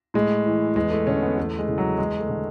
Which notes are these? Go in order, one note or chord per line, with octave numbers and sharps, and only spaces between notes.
A2 G#3
E3
E2 G#3
A3
D3 C#4
B3
E2 A3
G#3
C#3 E3
F#3
E2 G#3
A3
D3